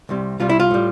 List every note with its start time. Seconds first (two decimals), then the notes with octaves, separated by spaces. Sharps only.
0.09 C2 C3 G3
0.39 C2 C3 G3 F4
0.49 E4
0.60 F4
0.71 A2 G3